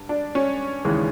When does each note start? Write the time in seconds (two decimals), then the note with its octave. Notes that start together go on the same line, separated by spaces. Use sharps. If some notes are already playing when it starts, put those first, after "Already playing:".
Already playing: G2
0.09 D4
0.35 C#4
0.85 D#2 C#3 E3 G#3